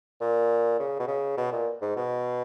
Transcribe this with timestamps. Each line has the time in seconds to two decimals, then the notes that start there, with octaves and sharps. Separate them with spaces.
0.21 A#2
0.80 C#3
0.99 B2
1.08 C#3
1.37 B2
1.52 A#2
1.82 G#2
1.96 B2